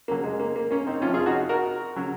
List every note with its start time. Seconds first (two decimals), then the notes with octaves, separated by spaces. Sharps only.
0.08 C#3 F#3 A#3
0.24 G#3
0.40 A#3
0.56 A#3
0.71 A#3 C#4
0.87 C4 D#4
1.02 C3 C#4 F4
1.07 F3
1.14 F4 G#4
1.26 D#4 F#4
1.49 F#4 A#4
1.96 C#3 F#3